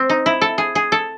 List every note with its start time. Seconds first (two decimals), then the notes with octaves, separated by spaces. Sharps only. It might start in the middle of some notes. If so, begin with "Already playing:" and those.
Already playing: C4
0.09 D#4
0.26 E4
0.41 A4
0.58 G#4
0.75 G#4
0.92 A4